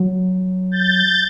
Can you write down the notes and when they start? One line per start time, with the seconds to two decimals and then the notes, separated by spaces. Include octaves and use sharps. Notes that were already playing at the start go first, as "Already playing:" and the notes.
Already playing: F#3
0.71 G6 A6